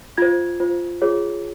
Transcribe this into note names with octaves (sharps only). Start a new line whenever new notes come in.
F4 C5 G#6
F4 C5
F4 G#4 C#5